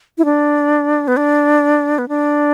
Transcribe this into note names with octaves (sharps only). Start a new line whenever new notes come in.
E4
D4
B3
D4
B3
D4